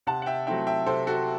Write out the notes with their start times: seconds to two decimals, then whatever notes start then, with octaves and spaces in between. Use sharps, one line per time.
0.07 C3 F#5 A5
0.22 F#5
0.26 E5 G5
0.47 F#3 A3 C4 E4 E5 G5
0.67 E5 G5
0.86 C3 A4 C5
1.07 F#4 A4